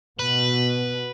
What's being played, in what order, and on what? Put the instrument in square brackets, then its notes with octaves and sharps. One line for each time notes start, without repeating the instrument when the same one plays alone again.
[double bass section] B2 [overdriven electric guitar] B4